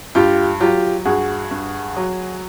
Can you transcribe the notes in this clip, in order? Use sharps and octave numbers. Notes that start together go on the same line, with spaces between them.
G2 F4 G4
F#3 F4 G4
G2 F#4 G#4
G2
F#3